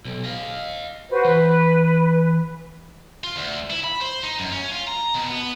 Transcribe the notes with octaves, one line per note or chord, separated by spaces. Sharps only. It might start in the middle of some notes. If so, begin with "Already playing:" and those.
B1
D#5 F5
F#4 B4 C5
E3 B4
F4
D2
E4
B5
C5
D#4
F#2
C#4
F4
A#5
B2
B3